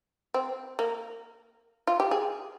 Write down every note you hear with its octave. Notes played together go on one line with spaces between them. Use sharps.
C4
A#3
F4
G4
G#4